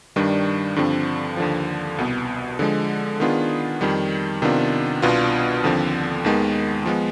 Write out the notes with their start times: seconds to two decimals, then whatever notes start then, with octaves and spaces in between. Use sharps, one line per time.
0.16 G2 D#3 G3 D4
0.76 G2 D3 F3 C4
1.37 D#2 D3 F3
1.98 C2 B2 B3
2.59 D3 F3 G#3
3.20 D#3 B3 D4 F4 G#4
3.81 F2 D#3 G3
4.42 C3 D#3 B3 D4 F4
5.02 C2 B2 B3 D4 F4
5.64 D#2 D3 F3 C4
6.25 D#2 D#3 G#3 B3
6.85 F3 G#3 B3